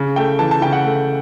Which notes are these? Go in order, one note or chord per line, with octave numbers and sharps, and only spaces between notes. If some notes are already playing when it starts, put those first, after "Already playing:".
Already playing: C#3
A3 G5
E3 A5
A5
C#3 G5
F#5
A3